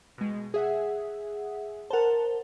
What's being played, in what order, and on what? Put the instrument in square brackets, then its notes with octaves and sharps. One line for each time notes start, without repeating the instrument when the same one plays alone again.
[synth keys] B2 G#3
G#4 E5 F#5
[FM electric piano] A#4 C5 [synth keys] F#5 A5